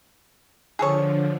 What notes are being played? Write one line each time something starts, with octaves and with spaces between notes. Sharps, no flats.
D3 F3 G#4 A4 C#5